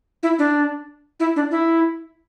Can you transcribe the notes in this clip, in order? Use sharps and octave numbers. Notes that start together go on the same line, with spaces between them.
E4
D4
E4
D4
E4